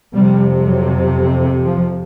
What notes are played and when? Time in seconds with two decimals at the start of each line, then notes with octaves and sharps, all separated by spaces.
0.15 F2 C3 G3
0.65 F#3
1.66 F3